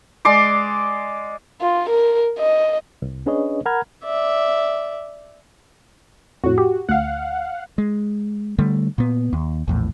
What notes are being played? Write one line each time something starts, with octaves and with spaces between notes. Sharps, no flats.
G#3 D5 C6 D6
F4
A#4
D#5
C2
C#4 D4 G#4 B4 C#5 D#5
A#4 F#5 A#5 B5 F6 G#6
D5 E5
F2 A2 F#4
G4
D2 F5 F#5
G#3
D3 G3 A3
A#2 B3
D#2
A#1 E2 A2